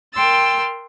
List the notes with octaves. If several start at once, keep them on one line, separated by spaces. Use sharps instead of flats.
A#4 G5 C6 E6 A6